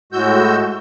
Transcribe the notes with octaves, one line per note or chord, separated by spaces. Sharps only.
A2 G#3 F#4 E6 G6